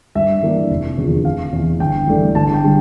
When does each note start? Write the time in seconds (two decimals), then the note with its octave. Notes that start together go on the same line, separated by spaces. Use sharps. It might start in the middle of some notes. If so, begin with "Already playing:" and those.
0.15 G2 E5
0.43 E3 A#3 D4
0.70 F1
0.98 E2 D3 F3
1.25 F1 F5
1.53 E2 E3
1.80 G1 G5
2.07 G2 E3 A3 D4
2.35 G1 A5
2.54 G5
2.64 D3 G3